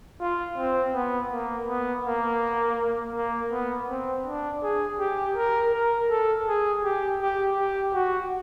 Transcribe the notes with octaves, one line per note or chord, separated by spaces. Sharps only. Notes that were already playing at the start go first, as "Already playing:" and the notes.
F4
C4
B3
A#3
B3
A#3
A#3
B3
C4
D4
G#4
G4
A#4
A#4
A4
G#4
G4
G4
G4
F#4